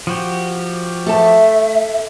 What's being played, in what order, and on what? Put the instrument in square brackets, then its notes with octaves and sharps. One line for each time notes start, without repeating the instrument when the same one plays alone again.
[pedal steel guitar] F3 F#4 G4
[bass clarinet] A3 [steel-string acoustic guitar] A4 A5 [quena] E5